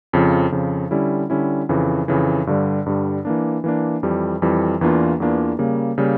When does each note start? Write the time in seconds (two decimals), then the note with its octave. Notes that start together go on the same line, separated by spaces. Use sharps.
0.13 F2 C#3 F3
0.52 F2 C#3 F3
0.91 D3 G3 C#4 E4
1.30 D3 G3 C#4 E4
1.69 F2 C#3 E3
2.08 F2 C#3 E3
2.47 G2 D3 G3
2.86 G2 D3 G3
3.25 E3 A#3 D4
3.64 E3 A#3 D4
4.03 F2 E3 G3
4.42 F2 E3 G3
4.81 E2 E3 A#3 D4 F4
5.20 E2 E3 A#3 D4 F4
5.59 C#3 G3 A#3
5.98 C#3 G3 A#3